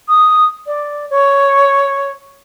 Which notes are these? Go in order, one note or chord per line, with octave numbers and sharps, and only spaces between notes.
D#6
D5
C#5